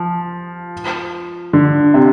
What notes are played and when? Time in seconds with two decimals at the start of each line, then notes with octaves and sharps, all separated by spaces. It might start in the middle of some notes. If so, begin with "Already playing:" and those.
Already playing: F3
1.53 D3
1.94 C3